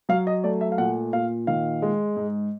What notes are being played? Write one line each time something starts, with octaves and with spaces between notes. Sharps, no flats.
F#3 F5
D#5
A3 D5
E5
F5
A#2 F#5
A#2 F5
D#3 F5
G#3
G#2